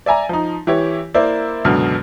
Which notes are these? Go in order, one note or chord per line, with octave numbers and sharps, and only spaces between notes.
D5 E5 G#5 A#5
F3 D#4
E3 E4 G4 C#5
A#3 E4 C5 D5 E5
C#2 F#2 B2 D3 F6